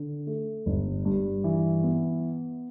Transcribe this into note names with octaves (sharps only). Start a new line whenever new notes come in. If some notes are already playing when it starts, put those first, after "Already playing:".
Already playing: D3
A3
G1
G2
E3
B3